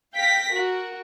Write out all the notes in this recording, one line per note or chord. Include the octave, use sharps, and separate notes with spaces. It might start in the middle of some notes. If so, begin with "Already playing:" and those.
F5 G5 A#6 B6
F#4 A#4